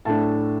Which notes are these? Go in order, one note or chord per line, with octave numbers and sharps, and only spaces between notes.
A2 A3 D4 A5